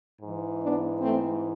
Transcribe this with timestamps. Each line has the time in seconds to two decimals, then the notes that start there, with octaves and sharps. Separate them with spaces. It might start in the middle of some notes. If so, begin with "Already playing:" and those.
0.21 G#2 E3
0.61 B3 D4
1.01 A3 C4